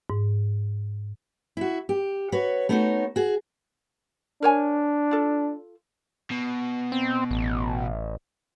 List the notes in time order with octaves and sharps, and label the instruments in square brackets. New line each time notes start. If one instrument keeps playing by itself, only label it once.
[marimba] G#2
[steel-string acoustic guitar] E4 F#4
G4
F#4 B4 C#5
A3 B3 D#4 F#4 C#5
F#4 G#4
[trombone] D4 [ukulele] A#4 C#5 G#5
[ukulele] F4 A4
[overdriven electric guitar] B2
[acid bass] C4
A1